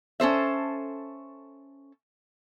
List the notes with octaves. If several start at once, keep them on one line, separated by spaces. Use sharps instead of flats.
C#4 A4 C5 E5